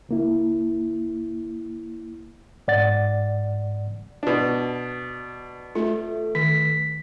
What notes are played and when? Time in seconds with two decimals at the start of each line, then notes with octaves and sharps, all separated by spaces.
0.09 C#2 A#3 E4
2.68 G#2 D5 F#5 A6
4.23 B2 D4
5.75 A3 F4
6.35 D#3 B6